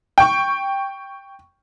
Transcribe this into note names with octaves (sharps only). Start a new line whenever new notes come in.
G5 C#6